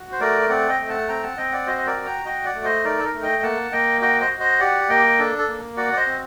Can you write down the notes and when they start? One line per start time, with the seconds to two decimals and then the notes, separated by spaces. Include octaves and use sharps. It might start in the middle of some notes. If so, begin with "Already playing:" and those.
Already playing: F#4
0.12 C5
0.20 A3 A#4 D5
0.49 C4 D5 F#5
0.69 D#5 G5
0.79 A3
0.89 F#5 A5
1.08 C4 G5 A#5
1.23 F#5 A5
1.37 C4 D#5 G5
1.52 D5 F#5
1.67 F#4 C5 D#5
1.77 D#5
1.87 A#4 D5
1.96 F#4
2.06 G5 A#5
2.25 F#4 D#5 G5
2.45 D5 F#5
2.55 A3
2.65 C5 D#5
2.84 D#4 A#4 D5
2.99 A4
3.04 A#4
3.14 A3
3.23 D#5 G5
3.43 A#3 F#5 A5
3.72 A#3 D#5 G5
4.01 F#4 D#5 G5
4.21 C5 D#5
4.31 F#4
4.40 C5 D#5
4.60 G4 D5 F#5
4.89 A#3 D#5 G5
5.19 D4 A4
5.38 A4
5.48 A#3
5.77 F#4 D5 F#5
5.93 D5
5.97 C5 D#5
6.07 C4